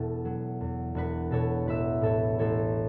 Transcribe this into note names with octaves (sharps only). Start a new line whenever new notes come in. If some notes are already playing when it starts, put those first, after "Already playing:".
Already playing: E1 E2 B2 E4 F#4 A4
F#3
E2
E1 F#4 B4
B2 A4 C#5
A1 B4 E5
A2 A4 C#5
A1 A4 C#5